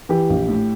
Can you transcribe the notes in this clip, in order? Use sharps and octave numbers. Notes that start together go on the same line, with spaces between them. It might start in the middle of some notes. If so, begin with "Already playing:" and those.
E3 G4
A#1
A2